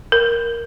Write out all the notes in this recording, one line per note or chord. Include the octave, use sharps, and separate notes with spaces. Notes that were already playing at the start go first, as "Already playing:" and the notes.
A#4